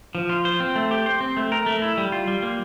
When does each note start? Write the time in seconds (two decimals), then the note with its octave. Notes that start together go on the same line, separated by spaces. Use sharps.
0.15 F3
0.29 F4
0.45 C5
0.60 C4
0.76 A3
0.91 G4
1.06 C5
1.21 C4
1.37 A3
1.52 A#4
1.66 A3
1.82 E4
1.98 G3
2.12 F4
2.27 G3
2.43 A#3